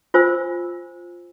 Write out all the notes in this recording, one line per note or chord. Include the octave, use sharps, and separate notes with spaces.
F4 C5 G#5 E6